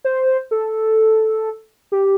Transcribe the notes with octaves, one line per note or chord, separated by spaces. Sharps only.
C5
A4
G4